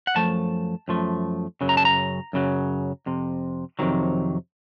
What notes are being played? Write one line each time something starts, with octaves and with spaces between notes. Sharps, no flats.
F#5
F#2 F3 A3 A5
F#2 F3 A3
F#2 C#3 F#3
A#5
A5
A#5
F#2 C#3 F#3
F2 C3
F2 C3 D#3 F#3